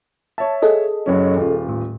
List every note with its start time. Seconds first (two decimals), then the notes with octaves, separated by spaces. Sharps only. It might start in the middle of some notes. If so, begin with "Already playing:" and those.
0.38 C#5 E5 A5
0.62 G#4 A4 D#5
1.06 F#1 F#3 C#4
1.36 D#1 F4
1.69 A2